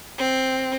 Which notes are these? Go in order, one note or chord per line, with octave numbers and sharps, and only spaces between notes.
C4